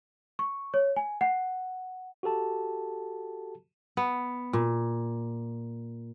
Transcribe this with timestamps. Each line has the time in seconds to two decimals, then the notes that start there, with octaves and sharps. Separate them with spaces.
0.39 C#6
0.74 C#5
0.96 G#5
1.21 F#5
2.23 F#4 G4 A4 A5
3.97 B3
4.53 A#2